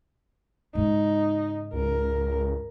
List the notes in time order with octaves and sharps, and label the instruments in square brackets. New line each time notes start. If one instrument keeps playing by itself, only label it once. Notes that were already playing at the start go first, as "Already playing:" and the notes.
[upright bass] G#2 C#3 [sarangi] D#4
[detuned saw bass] C#2 [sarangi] A#4